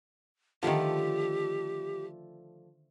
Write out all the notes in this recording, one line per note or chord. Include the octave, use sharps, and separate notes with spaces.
D3 D#3 F3 A3 G4 D5